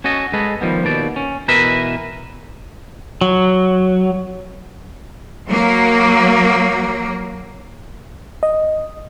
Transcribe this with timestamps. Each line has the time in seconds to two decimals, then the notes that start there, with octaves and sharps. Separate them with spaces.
0.04 C#4 F#4 A4 D#5
0.33 G#3 A4 B4 D#5
0.61 D#3 F3 G3 B3
0.84 D#2 B2 D5
1.16 C#4
1.48 B2 E3 A#4 B4 D#5 E5
3.21 F#3
5.49 F#3 A#3
8.43 D#5